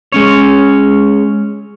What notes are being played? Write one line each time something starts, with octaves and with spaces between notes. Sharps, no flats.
G#3 C#4 C#5